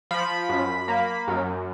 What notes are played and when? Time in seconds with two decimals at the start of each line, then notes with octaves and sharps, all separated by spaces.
0.11 F3 B5
0.49 F#2
0.88 A#3
1.28 F#2